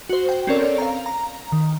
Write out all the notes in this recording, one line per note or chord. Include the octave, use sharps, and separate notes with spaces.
F#4 C5
G5
C4 C#4 A4 A#4 C#5 D5
F5 A#5
A#5
D#3